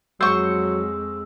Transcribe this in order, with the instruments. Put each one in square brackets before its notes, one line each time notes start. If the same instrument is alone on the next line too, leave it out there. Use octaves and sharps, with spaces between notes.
[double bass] F2 G#3 [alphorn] F#3 [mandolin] C5 C#6 [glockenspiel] E6